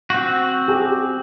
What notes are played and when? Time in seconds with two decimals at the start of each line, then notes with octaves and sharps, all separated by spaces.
0.10 C4 F#4
0.68 G4 G#4